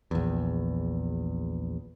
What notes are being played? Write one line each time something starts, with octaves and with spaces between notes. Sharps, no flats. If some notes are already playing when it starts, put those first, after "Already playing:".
A#1 E2